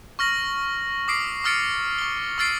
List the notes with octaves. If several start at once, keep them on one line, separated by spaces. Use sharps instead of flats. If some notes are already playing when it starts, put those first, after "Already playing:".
C#6 F6 A#6 F#7
D6 D#6 B6 C7 D7
C#6 D#6 F6 A6 C#7 D7
C#6 G7
C#6 E6 F6 A6 C7 D7